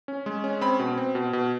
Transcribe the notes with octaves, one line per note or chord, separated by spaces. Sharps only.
C#4
G#3
C#4
C4 B5
B2
C4
B2
B2